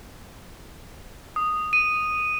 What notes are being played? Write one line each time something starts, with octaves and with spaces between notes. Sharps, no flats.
D#6
D#7